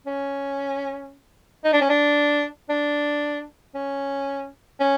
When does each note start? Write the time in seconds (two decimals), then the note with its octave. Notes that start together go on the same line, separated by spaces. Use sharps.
0.07 C#4
1.65 D#4
1.73 D4
1.82 C#4
1.89 D4
2.69 D4
3.75 C#4
4.80 C#4